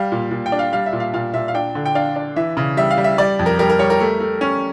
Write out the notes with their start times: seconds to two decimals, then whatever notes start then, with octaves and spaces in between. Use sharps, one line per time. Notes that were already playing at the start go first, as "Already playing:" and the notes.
Already playing: G3 F5
0.12 A#2
0.31 A#2
0.46 G5
0.52 D4
0.59 F5
0.73 G3 F5
0.86 E5
0.93 A#2
1.00 F5
1.13 A#2 F5
1.34 A#2 E5
1.48 F5
1.55 D4 G5
1.75 D3
1.85 G5
1.95 D4 F5
2.16 D4
2.36 E3 E5
2.57 C#3
2.77 G3 E5
2.91 F5
2.98 G3
3.04 E5
3.18 G3 D5
3.39 F2
3.46 A#4
3.59 G3 A#4
3.69 A#4
3.79 G3 C#5
3.90 A#4
4.00 A3
4.20 A3
4.41 C#4